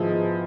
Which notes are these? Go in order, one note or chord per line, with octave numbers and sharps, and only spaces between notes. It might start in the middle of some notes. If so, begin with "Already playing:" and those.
Already playing: G#2 D#3 F3 G#3 B3 E4